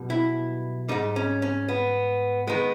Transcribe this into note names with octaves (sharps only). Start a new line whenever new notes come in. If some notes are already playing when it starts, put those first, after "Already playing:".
Already playing: B1 B2 G3
E4
G#2 G3 D#4
C#4
C#4
B3
D#3 G#3 B3